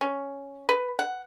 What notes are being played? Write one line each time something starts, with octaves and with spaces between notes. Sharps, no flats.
C#4
B4
F#5